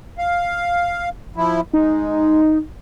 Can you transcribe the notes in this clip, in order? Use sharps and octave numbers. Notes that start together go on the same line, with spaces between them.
F5
F3 E4
G#3 D#4